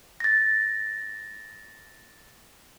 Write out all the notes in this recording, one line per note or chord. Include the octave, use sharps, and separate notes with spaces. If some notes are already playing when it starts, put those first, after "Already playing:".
A6 A#6